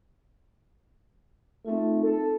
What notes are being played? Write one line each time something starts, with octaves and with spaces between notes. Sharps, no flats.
A3 C4 D#4 F4
A4